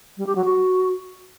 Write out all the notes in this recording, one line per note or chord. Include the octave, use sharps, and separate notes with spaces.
G3
G4
F#3
F#4